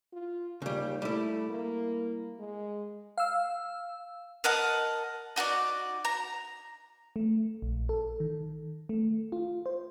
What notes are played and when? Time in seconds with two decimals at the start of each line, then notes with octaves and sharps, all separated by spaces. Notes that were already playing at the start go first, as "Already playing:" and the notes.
0.13 F4
0.62 D#2 C#3 G3
1.02 G3 A3 E4
1.49 A#3
2.39 G#3
3.18 F5 E6
4.44 A#4 D#5 F#5 A5
5.36 D#4 F#4 A4 D5
6.05 A#5
7.16 A3
7.62 A#1
7.89 A4
8.20 D#3
8.89 A3
9.32 F4
9.66 C5